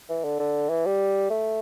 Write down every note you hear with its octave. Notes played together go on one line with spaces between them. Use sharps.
E3
D3
D3
E3
G3
A3